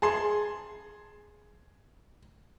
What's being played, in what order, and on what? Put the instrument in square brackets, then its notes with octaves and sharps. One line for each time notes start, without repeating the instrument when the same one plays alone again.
[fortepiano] G#4 A5 C6